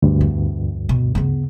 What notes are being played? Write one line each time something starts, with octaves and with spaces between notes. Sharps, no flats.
D2 G2
E2
B2
C#3 B3